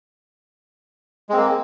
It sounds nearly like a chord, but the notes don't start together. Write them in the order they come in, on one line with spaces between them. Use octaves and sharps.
G#3 C4 A#3